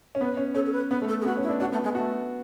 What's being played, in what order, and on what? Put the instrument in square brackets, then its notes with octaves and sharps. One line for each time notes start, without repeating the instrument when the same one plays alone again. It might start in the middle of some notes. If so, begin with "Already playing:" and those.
[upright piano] C#4
[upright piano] B3 [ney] B4
[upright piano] C#4
[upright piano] C#4 [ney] A4
[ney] A4
B4
[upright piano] B3 [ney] B4
[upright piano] A3
[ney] A4
G#4
[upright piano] B3 [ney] F#4
[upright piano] C#4
[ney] E4
[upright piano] D4
[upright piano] D4 [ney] F#4
[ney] A3 [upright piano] B3
[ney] G#3 [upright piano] B3
[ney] A3 [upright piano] F#4